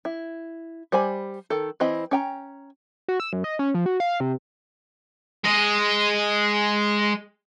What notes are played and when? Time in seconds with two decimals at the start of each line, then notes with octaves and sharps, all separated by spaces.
0.05 E4
0.92 G3 C5 G#5 B5
1.50 D#3 A4
1.80 E3 C4 E4 D#5 B5
2.11 C#4 G5 A#5
3.08 F#4
3.20 E6
3.33 F#2
3.44 D#5
3.59 C#4
3.74 F3
3.86 F#4
4.00 F5
4.20 C3
5.44 G#3 D#5